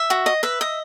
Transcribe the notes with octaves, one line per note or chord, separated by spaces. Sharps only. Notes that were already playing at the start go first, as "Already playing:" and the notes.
Already playing: E5
F#4
D#5
B4 E5
D#5